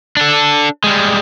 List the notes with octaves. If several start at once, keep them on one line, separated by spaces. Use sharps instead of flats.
D4 A4
G3 G#3